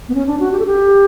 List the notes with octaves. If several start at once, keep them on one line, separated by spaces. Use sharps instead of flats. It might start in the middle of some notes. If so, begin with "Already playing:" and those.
B3
C#4
D4
F#4
G4
A4
G4